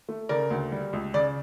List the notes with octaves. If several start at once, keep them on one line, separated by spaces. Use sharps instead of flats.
A3
C#3 A#4 D5
D2
G3
C#2
C#3 D5